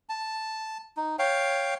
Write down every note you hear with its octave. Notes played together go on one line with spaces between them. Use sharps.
A5
D#4
C#5 F5 G5